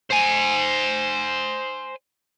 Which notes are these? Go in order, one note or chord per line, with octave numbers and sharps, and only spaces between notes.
C5 G#5